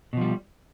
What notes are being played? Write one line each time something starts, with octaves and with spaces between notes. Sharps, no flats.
B2 F3 G3